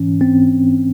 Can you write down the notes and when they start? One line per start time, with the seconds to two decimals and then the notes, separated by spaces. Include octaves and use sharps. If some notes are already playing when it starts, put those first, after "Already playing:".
Already playing: G#2 E3 C#4
0.20 G#2 C4